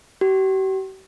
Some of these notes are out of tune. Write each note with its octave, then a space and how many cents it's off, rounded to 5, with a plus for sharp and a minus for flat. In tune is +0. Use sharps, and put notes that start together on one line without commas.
G4 -45